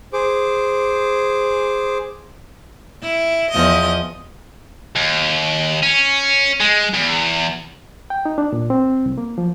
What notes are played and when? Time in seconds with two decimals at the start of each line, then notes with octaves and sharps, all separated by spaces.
0.13 G#4 C5 D6
3.02 E4
3.51 E2 F3 D#5
4.96 D#2
5.83 C#4
6.61 G#3
6.94 E2
8.10 G5
8.26 D#4
8.38 D4
8.53 A#2
8.70 C4
9.06 C2
9.18 A#3
9.38 F3